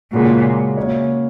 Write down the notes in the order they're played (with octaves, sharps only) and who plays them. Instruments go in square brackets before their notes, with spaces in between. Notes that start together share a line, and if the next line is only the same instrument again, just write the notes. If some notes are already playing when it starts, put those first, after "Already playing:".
[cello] A#2 [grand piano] C#3 G#3 C#4 F#4 A#4
[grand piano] C#3 A#3 F#4 C#5